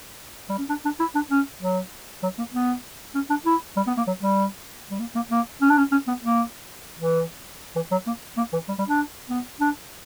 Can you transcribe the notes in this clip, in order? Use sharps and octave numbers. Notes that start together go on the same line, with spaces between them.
G3
C#4
D4
D4
E4
D4
C#4
F#3
F#3
A#3
B3
C#4
D4
E4
G3
B3
A#3
F#3
G3
G3
A#3
A#3
A#3
C#4
D4
C#4
C#4
B3
A#3
E3
E3
F#3
A#3
A#3
E3
G3
G3
D4
B3
D4